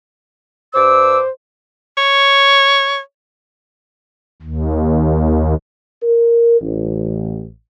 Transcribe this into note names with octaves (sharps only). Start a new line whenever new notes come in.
G2 C5 D6 E6
C#5
D#2
A#4
A1